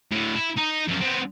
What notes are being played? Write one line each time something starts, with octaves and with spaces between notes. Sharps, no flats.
A2 D3
E4
D#4
F#2 F3
B3 C4